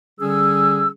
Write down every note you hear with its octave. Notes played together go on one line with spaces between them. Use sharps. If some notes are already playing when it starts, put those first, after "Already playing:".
D3 G3 C#4 G#4 E6